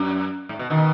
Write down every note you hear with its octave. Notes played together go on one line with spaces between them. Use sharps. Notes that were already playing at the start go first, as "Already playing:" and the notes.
Already playing: F#2
G#2
B2
B2 D#3